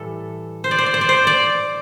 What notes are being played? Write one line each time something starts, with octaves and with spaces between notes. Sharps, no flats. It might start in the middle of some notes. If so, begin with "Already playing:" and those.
Already playing: A2 E3 G3 A4
C5
D5
C5
D5
C5
D5
C5
D5